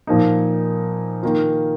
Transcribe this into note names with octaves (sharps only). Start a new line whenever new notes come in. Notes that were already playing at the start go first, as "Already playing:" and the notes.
A#2 F3 A#3 D#4
D#3 A#3 F4